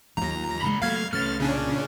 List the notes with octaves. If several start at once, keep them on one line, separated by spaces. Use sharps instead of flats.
D#2 F#3 F4 A#5
A#2 C#3 G#3 B5
F#3 A3 A#3 F5 F6 G#6
C2 A3 C#4 F6 A6
A#2 C#3 C#4 D4